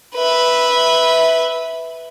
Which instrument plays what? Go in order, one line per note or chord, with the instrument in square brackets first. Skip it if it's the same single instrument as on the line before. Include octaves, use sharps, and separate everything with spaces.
[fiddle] B4 E5